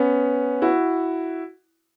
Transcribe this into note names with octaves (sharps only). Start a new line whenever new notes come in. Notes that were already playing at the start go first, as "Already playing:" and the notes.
Already playing: B3 C#4
E4 F#4